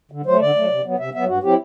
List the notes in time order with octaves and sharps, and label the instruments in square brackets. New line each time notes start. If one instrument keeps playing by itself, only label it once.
[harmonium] D3
F#3 A3 C5
D3 D5
F#3 A3
C3
F#3 B3
C3 E5
F#3 B3 E5
G2 F#4
F#3 C4 E4 G4